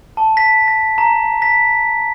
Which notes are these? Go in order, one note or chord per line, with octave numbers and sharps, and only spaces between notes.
A5
B6
A#6
A#5
B6